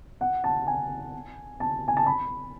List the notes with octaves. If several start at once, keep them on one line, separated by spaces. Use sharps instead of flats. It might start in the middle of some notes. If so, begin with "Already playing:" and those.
F#5
A5
G#5
A5
G#5
A5
B5